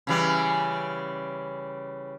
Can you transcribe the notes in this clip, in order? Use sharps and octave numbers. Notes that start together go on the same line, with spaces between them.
C#3 E3 G3